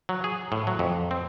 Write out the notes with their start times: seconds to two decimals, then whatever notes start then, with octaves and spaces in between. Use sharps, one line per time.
0.09 F#3
0.24 G#4
0.52 A2
0.67 F#3
0.79 F2
1.11 C4